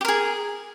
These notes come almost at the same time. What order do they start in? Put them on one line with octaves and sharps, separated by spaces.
G4 A#4 G#4